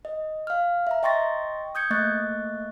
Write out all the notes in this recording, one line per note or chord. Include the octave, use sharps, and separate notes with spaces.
D#5
F5 F6
E5 A#5
D#5 G5 C6 C#6 A6 A#6
D#6 G6 G#6 C#7
A3 A#3 D#5 C#6 F#6 A6